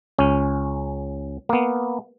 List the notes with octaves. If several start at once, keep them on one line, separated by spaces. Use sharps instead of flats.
C#2 C#4
A#3 B3